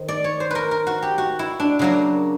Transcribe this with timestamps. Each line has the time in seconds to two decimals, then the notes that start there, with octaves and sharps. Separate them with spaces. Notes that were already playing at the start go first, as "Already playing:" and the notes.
Already playing: D#3 C5
0.08 D5
0.24 C#5
0.40 C5
0.51 A#4 B4
0.71 A#4
0.87 F#4
1.02 G4
1.18 F#4
1.39 E4
1.60 D4
1.79 C#3 F#3 A#3